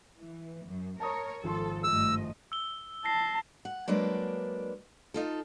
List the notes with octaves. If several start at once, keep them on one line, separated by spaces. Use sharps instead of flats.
E3
F#2
A#4 C#5 A5 A#5 D#6
G#1 F3 A4 C6
G2 A3 D#5 E6
E6 G7
A5 A#6 C7
F#5
F#3 G#3 A#3 D4 B4 D5
D#4 F4 A4